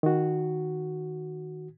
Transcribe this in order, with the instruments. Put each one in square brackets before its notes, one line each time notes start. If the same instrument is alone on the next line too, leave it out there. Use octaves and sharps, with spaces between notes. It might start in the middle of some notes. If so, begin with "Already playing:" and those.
[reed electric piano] D#3 F#4